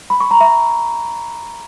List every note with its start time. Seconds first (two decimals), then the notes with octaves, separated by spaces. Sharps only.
0.10 B5
0.20 C#6
0.31 A#5
0.41 E5